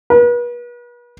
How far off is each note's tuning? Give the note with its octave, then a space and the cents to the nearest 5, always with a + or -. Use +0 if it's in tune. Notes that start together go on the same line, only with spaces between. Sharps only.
B4 -40